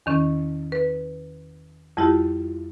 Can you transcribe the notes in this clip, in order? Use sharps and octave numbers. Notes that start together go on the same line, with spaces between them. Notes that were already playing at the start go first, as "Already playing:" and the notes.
E2 D#3 C#4
B4
F2 G3 E4 F4 G4